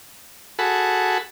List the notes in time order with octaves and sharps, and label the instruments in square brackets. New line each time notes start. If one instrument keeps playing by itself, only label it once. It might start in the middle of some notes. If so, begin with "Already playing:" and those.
[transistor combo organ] F#4 G#4 A4 B5